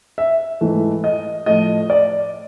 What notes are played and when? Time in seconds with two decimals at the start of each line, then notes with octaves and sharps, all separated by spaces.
0.18 E5
0.61 G#2 E3 A3
1.04 D#5
1.46 A2 F3 A3 D#5
1.90 D5